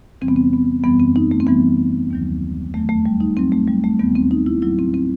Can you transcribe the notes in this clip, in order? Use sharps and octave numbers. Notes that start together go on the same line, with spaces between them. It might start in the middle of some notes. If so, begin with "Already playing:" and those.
E2 C3 E3 G3 C4
B3
C4
B3
F#2 E3 G3 B3
C4
D#4
A3
C4
F#2 E3 G3 B3
D#2 D#3 F#3
E2 D#3 F#3 A3
A3
G3
D#4
G2 F#3 C4
A3
G3
A3
D#2 D#3 G3 B3
C4
D#4
E4
A2 F#3 E4
C4
C4